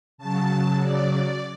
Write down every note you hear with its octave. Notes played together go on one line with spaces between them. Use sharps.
C#3 F#3 A5
D5